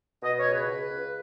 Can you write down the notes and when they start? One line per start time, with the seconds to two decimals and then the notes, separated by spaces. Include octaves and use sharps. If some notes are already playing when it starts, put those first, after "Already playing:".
0.23 B2 D#5
0.38 C#5
0.45 C#2
0.52 B4
0.67 C#2
0.90 C#2